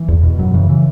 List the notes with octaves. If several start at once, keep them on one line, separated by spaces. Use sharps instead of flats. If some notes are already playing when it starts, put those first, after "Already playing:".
Already playing: E3
E2
B2
F#2 F#3
C#3 E3
E3